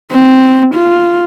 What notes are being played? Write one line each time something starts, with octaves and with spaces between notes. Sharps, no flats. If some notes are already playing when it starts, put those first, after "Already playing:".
C4
F4